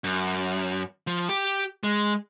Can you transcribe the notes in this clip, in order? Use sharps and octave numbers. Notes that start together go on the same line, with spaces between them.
F#2
F3
G4
G#3